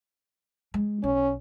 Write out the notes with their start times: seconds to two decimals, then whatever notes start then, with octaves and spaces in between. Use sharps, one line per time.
0.74 G#3
1.04 B1 C#4